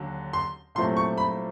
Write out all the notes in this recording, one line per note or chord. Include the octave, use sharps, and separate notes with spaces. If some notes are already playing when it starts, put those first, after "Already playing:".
Already playing: D#2 D3 F#3
C6
C2 A#2 F#3 A3 C4 C6
C#6
B5